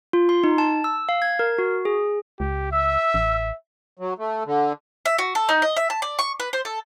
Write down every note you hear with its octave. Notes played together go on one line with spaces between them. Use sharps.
F4
C6
D#4
A5
E6
F5
G#6
A#4
F#4
G#4
C#2 G4
E5 E6
A1
F#3
A3
D3
E5
F#4
A4
D#4
D#5
E5
A5
D5
C#6
B4
C5
A4